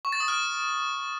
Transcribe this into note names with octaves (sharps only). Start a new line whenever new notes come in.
C#6
A6
D#6
F6